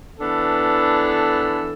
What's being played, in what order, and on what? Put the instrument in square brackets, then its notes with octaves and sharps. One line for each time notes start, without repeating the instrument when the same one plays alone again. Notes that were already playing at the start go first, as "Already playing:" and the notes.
[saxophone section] E3 B3 D4 A4